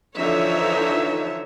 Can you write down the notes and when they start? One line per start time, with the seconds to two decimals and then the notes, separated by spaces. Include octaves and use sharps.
0.17 D3 E3 F3 D#4 C#5 E5